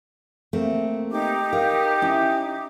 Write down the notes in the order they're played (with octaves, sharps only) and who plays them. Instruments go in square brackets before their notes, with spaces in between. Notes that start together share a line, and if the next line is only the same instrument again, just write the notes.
[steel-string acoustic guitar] A3 A#3 C4
[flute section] D#4 G4 D6
[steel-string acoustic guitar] A#4 F5
C#4 E4